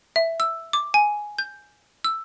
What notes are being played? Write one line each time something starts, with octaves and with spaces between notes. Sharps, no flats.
E5
E6
D6
G#5
G6
E6